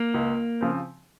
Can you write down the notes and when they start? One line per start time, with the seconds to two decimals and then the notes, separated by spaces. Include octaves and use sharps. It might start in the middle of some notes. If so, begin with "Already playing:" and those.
Already playing: A#3
0.14 C#2
0.61 C#3 F3 C4